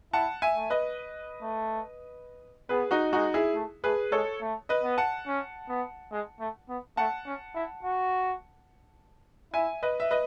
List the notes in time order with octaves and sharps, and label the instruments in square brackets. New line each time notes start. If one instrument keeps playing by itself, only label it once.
[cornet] E4 [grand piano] F#5 A5
[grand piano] E5 G#5
[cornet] A3
[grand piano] B4 D#5
[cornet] A3
[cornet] B3 [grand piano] G#4 B4
[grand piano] D#4 F#4
[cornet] G#3 [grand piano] D#4 F#4
[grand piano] E4 G#4
[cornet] A3
[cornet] A3 [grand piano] G#4 B4
[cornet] G#3 [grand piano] A4 C#5
[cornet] A3
[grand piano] B4 D#5
[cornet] B3
[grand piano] F#5 A5
[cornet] C#4
B3
G#3
A3
B3
[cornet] A3 [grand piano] F#5 A5
[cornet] C#4
E4
F#4
[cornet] E4 [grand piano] E5 G#5
[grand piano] B4 D#5
E5
B4 D#5